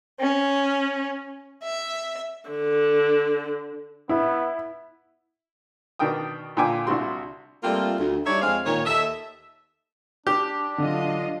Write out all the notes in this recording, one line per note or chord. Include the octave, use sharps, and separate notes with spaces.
C#4
E5
D3
B3 E4
B2 D#3 D4 A#4 G5 D#6
A#2 D3 G5 G#5 D6
C2 D4 E4 F#4 C6
G3 A3 A#3 C4 F4
D2
G3 D4 D#4 C#5 D5 E5
F2 G#3 C4 F5
A#2 D#3 C#5
D#2 A4 D#5 E5
D4 G4
D3 F#3 F4 D#5